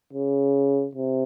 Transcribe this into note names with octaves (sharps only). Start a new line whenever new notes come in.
C#3
C3